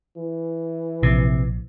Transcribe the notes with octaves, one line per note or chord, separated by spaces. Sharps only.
E3
A#1 C3